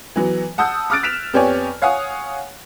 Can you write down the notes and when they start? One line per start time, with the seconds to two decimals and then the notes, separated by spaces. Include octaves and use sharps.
0.16 E3 F#3 B3
0.58 F#5 A5 D#6 E6 G6
0.90 D6 D#6 F6 F#6 A6 D7
1.03 F#6 B6 D7 E7 F7
1.33 F2 B3 G4 C#5 D5 G#5
1.82 C#5 F5 F#5 G#5 D#6